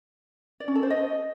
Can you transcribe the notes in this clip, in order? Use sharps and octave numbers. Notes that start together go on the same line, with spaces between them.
D5
C#4
A4
C5
D#5